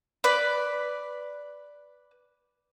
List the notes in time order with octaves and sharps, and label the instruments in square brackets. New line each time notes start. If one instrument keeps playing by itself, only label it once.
[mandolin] B4 D5